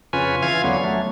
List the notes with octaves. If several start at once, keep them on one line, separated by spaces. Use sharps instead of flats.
F2 C#3 C#4 F4 B4 G#5
E3 F4 F5 G#6
E2 D3 F#3 B3 C#4
F#3 A3